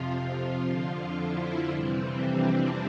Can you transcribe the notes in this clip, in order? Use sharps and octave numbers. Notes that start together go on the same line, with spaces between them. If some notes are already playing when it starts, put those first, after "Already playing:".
Already playing: F2 C3 F3 F4
F4
F2 D3 F3
E4
F2 C3 E3 G3 C4
D4